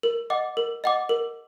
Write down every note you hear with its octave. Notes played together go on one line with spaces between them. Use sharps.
A#4
D#5 F#5 D6
A#4
D#5 F#5 D6
A#4